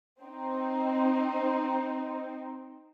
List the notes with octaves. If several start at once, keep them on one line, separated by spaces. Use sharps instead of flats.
C4 D#4